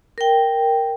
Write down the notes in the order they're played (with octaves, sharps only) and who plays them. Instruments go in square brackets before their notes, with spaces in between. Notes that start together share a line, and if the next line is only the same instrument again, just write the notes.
[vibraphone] A#4 G5